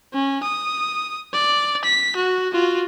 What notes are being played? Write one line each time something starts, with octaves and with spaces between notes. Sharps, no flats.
C#4
D#6
D5
B6
F#4
F4 F#4